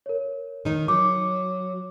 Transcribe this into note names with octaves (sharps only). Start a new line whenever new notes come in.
A#4 C#5
D#3 D#4
F#3 D6